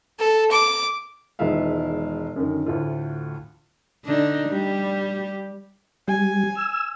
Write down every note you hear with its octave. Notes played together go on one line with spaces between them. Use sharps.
A4
D6
E1 D#3 G#3 F4 E5 F5
F#2 D3 D#3
D2 A2 F4
D3 D4 D#4
G3 G4
G3 G#5
E6